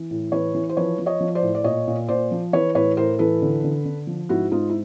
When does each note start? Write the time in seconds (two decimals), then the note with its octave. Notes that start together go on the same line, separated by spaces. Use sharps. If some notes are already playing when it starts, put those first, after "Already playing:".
Already playing: E3
0.11 A2
0.32 E3 B4 C#5
0.54 E3
0.69 C5
0.77 F3 B4 C#5
0.99 F3
1.06 C#5 D#5
1.20 F3
1.35 C5 D5
1.43 A2
1.55 D5
1.64 A#2 C#5 D#5
1.88 A#2
2.08 A#2 C5 D5
2.31 F3
2.53 E3 B4 C#5
2.75 A2 B4 C#5
2.97 A2 A#4 C5
3.19 E3 A4 B4
3.42 D3
3.64 D3
3.85 D3
4.07 F3
4.29 G#2 E4 F#4
4.52 G#2 D#4 F4
4.70 E4